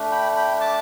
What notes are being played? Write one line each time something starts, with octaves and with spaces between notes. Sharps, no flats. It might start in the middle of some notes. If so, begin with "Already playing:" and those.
Already playing: A3 D4
G5 B5
G5 B5
A5 D6